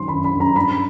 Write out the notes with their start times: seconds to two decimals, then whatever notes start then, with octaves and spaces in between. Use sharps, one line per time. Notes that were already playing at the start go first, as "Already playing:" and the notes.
Already playing: F#2 D#3 F#3 C6
0.08 B5
0.14 F#2
0.24 B5
0.34 F#2
0.40 A#5
0.56 G2 B5